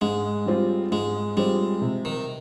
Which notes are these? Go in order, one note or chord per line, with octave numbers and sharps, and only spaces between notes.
G#2 G#3
G3 C4 F4
G#2 G#3
G3 G#3 C4 F4
C3
D#3